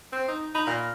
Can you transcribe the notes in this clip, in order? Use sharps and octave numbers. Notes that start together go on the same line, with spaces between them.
C4
D#4
D#4 B5
A#2 F6 A#6